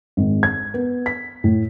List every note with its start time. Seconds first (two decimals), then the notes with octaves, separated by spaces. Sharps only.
0.17 G#1
0.43 G#6
0.74 B3
1.06 B6
1.44 A2